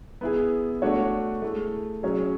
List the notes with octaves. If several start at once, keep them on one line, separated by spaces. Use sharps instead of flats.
B3 E4 G#4
A3 D4 F#4 C#5
A3 E4 G#4
F#3 C#4 G#4 C#5